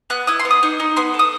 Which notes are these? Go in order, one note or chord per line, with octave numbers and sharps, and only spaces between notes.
B3 F#6
E4 D#6
C6
B3
D#6
D#4
D#4
B3 C6
A4
D#6